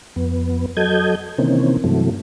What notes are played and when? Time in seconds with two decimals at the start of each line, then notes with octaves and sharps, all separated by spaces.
0.16 F2 B3
0.77 F#3 A4 D#5 G6 G#6
1.38 C3 D#3 E3 A#3 C4 C#4
1.84 G2 C3 E3 F#3 A3